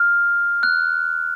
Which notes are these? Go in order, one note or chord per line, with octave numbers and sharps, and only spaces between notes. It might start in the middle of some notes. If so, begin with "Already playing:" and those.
Already playing: F6
F#6